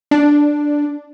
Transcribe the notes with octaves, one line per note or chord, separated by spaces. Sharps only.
D4